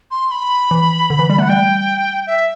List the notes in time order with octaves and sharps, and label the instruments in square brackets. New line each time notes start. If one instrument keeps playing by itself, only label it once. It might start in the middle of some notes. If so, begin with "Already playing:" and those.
[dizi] C6
B5
[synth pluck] E3
D3
E3
G3
[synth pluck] A3 [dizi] F#5
[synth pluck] G3 [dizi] G5
[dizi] E5